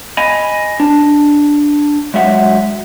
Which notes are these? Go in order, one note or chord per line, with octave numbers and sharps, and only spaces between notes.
D#5 G#5 B5
D4
F#3 G#3 F#4 E5 F#5